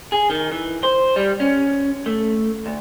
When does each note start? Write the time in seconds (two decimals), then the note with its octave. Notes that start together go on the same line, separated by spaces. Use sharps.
0.12 G#4
0.30 D#3
0.52 E3
0.83 C5
1.16 G3
1.40 C#4
2.06 A3
2.66 D2